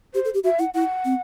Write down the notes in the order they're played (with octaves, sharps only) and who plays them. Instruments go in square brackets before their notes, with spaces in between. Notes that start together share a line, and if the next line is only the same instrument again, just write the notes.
[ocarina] G4 [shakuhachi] C5
[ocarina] A4
G4
[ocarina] F#4 [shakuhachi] E5
[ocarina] E4 [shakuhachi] F#5
[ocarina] E4 [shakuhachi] F#5
[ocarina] C4